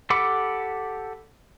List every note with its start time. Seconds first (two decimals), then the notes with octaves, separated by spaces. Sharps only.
0.10 G4 A4 F#5 B5 D6